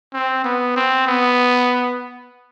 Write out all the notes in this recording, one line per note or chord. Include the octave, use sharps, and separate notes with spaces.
C4
B3
C4
B3